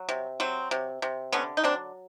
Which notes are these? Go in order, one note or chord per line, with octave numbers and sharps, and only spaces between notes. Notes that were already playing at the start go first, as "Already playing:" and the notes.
Already playing: F#3
C3
F#3 C4
C3
C3
D3 B3 C#4
D#4
F#3 C4 D4